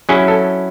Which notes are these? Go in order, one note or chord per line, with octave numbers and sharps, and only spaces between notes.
F#3 C#4 E4 G#4
A4